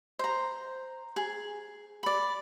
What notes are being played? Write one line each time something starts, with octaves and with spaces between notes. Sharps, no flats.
C5 A#5
G#4
D5 B5